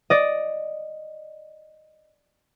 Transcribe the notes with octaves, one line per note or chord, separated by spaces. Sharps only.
D5 D#5